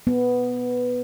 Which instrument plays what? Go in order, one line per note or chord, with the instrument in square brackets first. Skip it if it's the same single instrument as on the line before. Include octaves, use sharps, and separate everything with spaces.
[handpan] B3